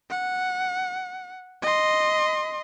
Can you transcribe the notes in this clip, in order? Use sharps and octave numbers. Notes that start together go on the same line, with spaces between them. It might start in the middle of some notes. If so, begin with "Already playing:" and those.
F#5
D#5 C6